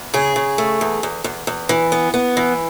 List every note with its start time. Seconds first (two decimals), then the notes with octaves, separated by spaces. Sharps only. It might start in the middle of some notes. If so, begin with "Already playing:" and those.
Already playing: E2
0.14 C#3 G#4
0.36 C#3
0.58 A3
0.81 E2
1.03 E2
1.24 E2
1.47 E2
1.69 E3
1.92 B3
2.14 B3
2.37 E3